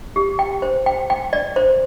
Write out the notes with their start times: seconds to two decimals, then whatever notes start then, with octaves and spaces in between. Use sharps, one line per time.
0.16 G4
0.39 G5
0.62 C5
0.86 G5
1.10 G5
1.33 D5
1.56 C5